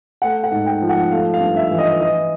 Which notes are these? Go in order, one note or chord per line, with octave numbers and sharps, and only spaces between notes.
A3 F#5
F#5
G#2
G5
F3
F#5
A3 F5
F5
G2
E5
E3
D#5
E3 D#5